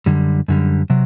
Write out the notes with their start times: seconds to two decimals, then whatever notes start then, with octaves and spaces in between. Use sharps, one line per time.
0.06 F#2 D3 G3
0.48 F#2 D3 G3
0.90 C3 F#3